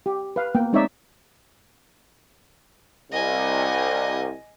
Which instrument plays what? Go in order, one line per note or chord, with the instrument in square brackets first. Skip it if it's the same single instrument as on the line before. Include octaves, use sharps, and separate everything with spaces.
[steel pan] G4
B4 F5
A#3 B3 G5
G#3 C4 D#4 C#5 D5 E5
[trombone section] C2 [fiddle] D#5 G#5